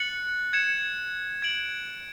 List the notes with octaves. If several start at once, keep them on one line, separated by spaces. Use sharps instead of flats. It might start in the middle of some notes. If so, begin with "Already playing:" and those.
Already playing: F#6 A6 C#7 F#7
G#6 C#7 E7
G#6 D7 F#7